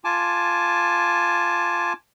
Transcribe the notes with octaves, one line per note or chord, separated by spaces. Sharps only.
F4 G#5 A5 D6